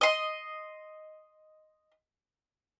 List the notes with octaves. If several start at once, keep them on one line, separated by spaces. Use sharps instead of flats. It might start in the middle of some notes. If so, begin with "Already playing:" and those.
D#5 C6